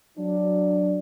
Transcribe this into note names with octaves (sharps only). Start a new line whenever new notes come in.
F#3 D4